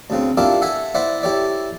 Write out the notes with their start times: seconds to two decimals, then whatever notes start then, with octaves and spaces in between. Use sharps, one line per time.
0.10 D2 C#3 C4
0.37 D4 E4 F4 G4 A4 A#4
0.62 A4 E5 F#5 G#5
0.94 E4 C5 D5 E5 F#5
1.23 E4 G4 A4 C#5 D5